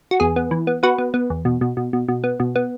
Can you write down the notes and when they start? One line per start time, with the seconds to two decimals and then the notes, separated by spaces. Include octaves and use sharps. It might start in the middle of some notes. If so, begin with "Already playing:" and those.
0.11 F#4
0.20 E2 G#4
0.36 B3
0.51 E3
0.67 B3
0.83 B3 F#4 B4
0.98 B3
1.14 B3
1.30 E2
1.45 B2
1.61 B2
1.77 B2
1.93 B2
2.08 B2
2.24 B3
2.40 B2
2.56 B3